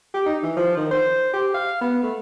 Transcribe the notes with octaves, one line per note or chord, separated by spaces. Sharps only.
G4
D#4
E3
F3
D#3
C5
G4
F5
B3
A3